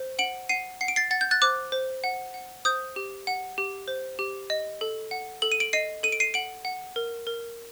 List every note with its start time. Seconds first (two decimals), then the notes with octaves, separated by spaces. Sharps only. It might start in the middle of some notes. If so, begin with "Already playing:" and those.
Already playing: C5
0.19 F#5 D7 F#7
0.49 F#5 C7 D#7
0.81 F#5 C7
0.88 D7
0.96 A6 C7
1.11 F#5 A6
1.21 G6
1.31 F#6 A6
1.42 C5 D6 F#6
1.72 C5
2.04 F#5
2.34 F#5
2.65 C5 D#6 G6
2.96 G4
3.27 F#5
3.58 G4
3.88 C5
4.19 G4
4.50 D#5
4.81 A4
5.11 F#5
5.42 A4 F#7
5.52 D#7
5.60 D7 F#7
5.73 D#5 C7 D#7
6.03 A4 D#7
6.12 D7
6.20 C7 D#7
6.34 F#5 D7 F#7
6.65 F#5
6.96 A#4
7.27 A#4